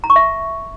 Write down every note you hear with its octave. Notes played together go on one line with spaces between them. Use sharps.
A#5
C#6
E5